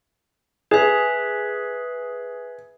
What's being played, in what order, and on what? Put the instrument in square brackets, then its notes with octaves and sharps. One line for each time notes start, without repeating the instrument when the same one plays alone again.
[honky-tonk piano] G#4 [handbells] B4 E5